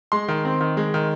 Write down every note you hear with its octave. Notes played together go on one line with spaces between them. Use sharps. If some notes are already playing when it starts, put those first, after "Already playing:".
G#3 C6
D#3
C4
D#3
G#3
D#3